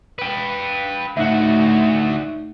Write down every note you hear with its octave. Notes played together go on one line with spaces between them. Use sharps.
B4 G5
D2 A2 D#4 F#4 E5